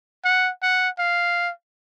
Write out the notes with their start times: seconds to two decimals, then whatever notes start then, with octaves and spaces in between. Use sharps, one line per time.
0.25 F#5
0.63 F#5
0.99 F5